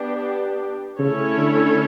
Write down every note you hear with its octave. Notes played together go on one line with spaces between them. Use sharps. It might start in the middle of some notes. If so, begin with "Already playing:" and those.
Already playing: B3 D4 G4
C#3 A3 C#4 E4 A4 C#5
D3